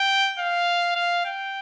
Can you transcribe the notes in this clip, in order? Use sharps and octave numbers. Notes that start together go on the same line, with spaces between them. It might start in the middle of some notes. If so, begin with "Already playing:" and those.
Already playing: G5
F5
F5
G5